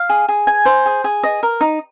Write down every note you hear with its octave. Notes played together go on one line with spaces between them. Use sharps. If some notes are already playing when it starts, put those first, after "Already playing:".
Already playing: F5
G#4
G#4
G#5
C5
G#4
G#4
D#5
A#4
D#4